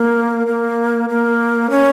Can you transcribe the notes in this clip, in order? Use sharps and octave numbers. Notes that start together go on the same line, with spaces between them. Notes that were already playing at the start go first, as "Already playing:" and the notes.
Already playing: A#3
A#3
A#3
C#4